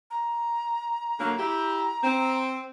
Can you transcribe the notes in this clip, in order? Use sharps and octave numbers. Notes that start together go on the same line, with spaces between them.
A#5
D3 F#3 A#3
E4 G4 A#5
C4